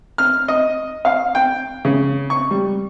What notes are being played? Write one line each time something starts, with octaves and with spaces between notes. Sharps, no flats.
F6
D#5
F5
G5
C#3
C#6
G3